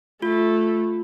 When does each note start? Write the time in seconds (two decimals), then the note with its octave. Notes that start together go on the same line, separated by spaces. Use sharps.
0.22 A3 F4